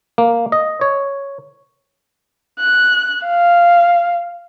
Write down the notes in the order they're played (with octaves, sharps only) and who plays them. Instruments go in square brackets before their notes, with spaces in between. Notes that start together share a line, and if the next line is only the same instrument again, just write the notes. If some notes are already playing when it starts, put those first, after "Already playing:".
[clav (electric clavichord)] A#3
D#5
C#5
[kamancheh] F#6
F5